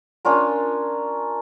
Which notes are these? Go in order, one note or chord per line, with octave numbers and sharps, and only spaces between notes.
C#4 D4 F4 A#4